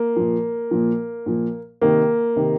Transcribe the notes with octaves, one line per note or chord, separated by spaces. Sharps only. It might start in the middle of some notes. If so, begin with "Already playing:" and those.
Already playing: A#3
A#2 F3
A#2 F3
A#2 F3
C3 D#3 A#3
C3 D#3